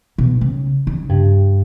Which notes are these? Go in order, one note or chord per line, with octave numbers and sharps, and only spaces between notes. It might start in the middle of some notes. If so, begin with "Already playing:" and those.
B2
C#3
C#3
G2